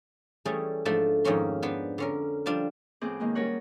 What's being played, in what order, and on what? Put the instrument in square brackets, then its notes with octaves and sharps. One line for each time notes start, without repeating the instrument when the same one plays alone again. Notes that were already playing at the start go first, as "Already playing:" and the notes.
[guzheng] E3 G3 A3 C#4 G#4
G#2 F3 A3 D4 A4 C6
F2 G#2 D#3 A#3 C#4 C6
B3 D4 B4 C5
D3 C#4 A#4
F3 G3 D4 F4
[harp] A2 F3 B3 C4 G#4 D6
D#3 G#3 A#3
G3 C#4 A#4 C#5 F#5